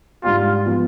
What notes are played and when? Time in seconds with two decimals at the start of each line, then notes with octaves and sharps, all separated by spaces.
0.23 G#2 G3 D4 F4 G4
0.64 F3 B3 F4